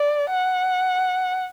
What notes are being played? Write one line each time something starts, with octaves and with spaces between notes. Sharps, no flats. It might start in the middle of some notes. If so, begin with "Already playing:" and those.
Already playing: D5
F#5